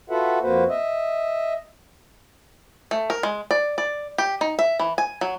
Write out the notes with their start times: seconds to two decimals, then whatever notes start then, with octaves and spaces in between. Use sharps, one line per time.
0.10 F4 F#4 A4 B4 E5 F#5
0.42 F2 A#3 F#4 B4 C5
0.69 D#5 E5
2.91 A3
3.10 A#4
3.23 G#3
3.51 D5
3.78 D5
4.18 G4
4.41 D#4
4.59 E5
4.79 E3
4.98 G#5
5.21 F#3